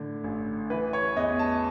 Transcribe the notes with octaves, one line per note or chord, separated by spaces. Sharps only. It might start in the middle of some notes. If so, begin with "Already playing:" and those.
Already playing: A2 D3
A1
E3 B4
C#5
E2 D#5
A5